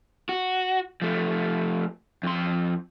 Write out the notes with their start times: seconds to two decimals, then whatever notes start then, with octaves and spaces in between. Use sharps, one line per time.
0.29 F#4
1.02 F3 A3
2.23 F2 C6